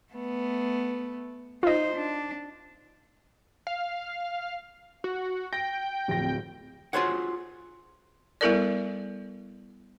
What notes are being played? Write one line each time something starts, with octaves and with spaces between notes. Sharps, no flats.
A3 B3
D#4 F4 C5 D#5
D4
F5
F#4
G5 A#6
D1 F2 A#6
F4 F#4 G#4 C5 C#5 F#5
G3 B3 E4 A4 A#4 D5